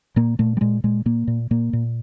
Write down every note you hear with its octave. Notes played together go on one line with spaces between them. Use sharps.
A#2 A#3
A#2 A3
G3
A#2 G#3
A#2 G#3
A#2 A#3
A#2
A#2 A#3
A#2